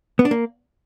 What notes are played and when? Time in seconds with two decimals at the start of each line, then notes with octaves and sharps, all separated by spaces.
0.19 B3
0.25 D4
0.31 A#3